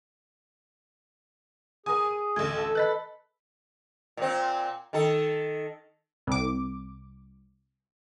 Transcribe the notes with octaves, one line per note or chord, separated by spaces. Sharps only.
G#4 A#4 G#5 D#6
D#7
A1 D2 G#6
A4
B4 D#5 B5 F#6 A6 B6
A#2 C4
D#3 A4
C2 D6